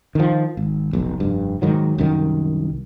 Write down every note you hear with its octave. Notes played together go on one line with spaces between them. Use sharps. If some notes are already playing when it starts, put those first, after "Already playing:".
D#3 F3
G#1
F1 B1
F1 G2
G#2 D#3 F#3
C2 F#2 D#3